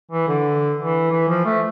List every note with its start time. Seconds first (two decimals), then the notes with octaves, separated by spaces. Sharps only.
0.11 E3
0.28 D3
0.78 E3
1.11 E3
1.29 F3
1.45 A3